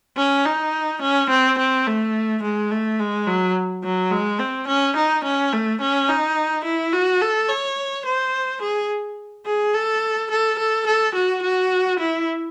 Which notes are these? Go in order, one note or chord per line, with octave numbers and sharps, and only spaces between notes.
C#4
D#4
C#4
C4
C4
A3
G#3
A3
G#3
F#3
F#3
G#3
C4
C#4
D#4
C#4
A3
C#4
D#4
E4
F#4
A4
C#5
C5
G#4
G#4
A4
A4
A4
A4
F#4
F#4
E4